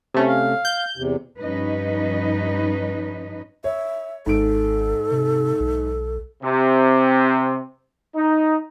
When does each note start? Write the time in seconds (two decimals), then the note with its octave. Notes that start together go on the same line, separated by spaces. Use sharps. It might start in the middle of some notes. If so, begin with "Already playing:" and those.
0.14 C3 A3 C#4
0.28 F5
0.65 G6
0.97 E2 C3
1.41 G2 F3 C#4 D#4 B4 D#5
3.64 C#5 E5
4.26 G#1 G#2 A4 D7
5.11 C3
5.60 B1
6.43 C3
8.15 D#4